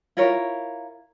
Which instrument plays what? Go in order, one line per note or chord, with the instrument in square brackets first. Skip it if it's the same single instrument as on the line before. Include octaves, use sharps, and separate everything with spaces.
[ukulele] E4 F4 A#4 C#5